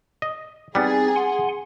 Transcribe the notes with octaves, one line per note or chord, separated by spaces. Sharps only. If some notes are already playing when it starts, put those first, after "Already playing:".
D#5
G3 B3 C4 D#4 G#4 A6
F#5 G#5 C6